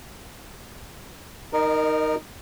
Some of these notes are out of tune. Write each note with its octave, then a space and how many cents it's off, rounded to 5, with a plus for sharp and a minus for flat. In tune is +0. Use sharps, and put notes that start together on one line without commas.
D#4 +0 A#4 +0 D#5 -35